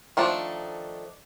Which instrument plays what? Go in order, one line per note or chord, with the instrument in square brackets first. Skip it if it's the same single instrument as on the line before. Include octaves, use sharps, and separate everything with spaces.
[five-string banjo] D#3 F3 A3 D4